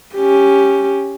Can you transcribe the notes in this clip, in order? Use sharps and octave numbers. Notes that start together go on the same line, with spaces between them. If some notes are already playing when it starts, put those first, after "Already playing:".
C#4 G4